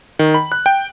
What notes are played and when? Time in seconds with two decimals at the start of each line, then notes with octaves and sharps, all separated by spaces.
0.19 D#3
0.34 B5
0.52 F#6
0.66 G5